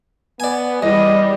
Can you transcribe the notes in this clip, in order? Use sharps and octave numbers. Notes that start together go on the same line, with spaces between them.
B3 D5 G#5
E2 G3 D#5